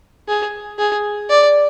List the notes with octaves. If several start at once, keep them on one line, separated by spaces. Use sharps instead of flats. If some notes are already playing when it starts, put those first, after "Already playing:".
G#4
G#4
D5